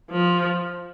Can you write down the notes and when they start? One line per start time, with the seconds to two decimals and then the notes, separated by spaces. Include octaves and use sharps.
0.11 F3